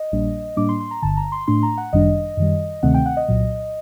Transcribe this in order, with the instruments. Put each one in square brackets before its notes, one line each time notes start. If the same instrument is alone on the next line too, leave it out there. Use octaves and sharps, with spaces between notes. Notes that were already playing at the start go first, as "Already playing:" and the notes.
Already playing: [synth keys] D#5
A#1 A#2 G3 A#3 D4
A2 G3 A#3 D4 D6
C6
C6
A#5
G1 G2 D3 A5
A#5
C6
A2 A3 D4 C6
A#5
F#5
G1 F#2 D#3 G3 D4 D#5
F#2 D#3 G3
D2 C3 D#3 A3 C4 F#5
G5
F#5
D#5
C2 A#2 F#3